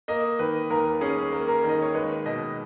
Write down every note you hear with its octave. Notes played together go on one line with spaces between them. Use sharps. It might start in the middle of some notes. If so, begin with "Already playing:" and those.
A#3 D#5
D#3 B4
D#2 A#4
C#4 G#4
A#3
A#4
D#3
D#5
C#5
G#3 B4
B2 D#5